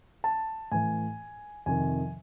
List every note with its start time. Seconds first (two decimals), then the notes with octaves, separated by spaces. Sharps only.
0.24 A5
0.71 A2 E3 G#5
1.66 F2 C3 D#3 G#5